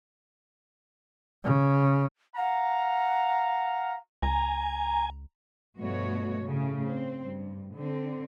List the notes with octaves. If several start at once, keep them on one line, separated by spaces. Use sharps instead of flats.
C#3
F5 F#5 A#5
C#2 G#5 A#5
G2 B2 F3 A3 F#4 C#5
A2 C#3 A3
C4
G2
D3 C4